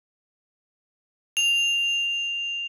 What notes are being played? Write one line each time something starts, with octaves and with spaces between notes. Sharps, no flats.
F7